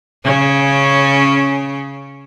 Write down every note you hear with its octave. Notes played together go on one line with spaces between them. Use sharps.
C#3 C#4